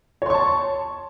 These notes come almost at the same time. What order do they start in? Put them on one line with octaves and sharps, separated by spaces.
C#5 C6 C#6 A5